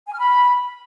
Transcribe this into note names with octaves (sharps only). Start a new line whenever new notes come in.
G#5
F6
B5